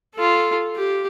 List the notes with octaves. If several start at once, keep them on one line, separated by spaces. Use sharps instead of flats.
F4 A4
G4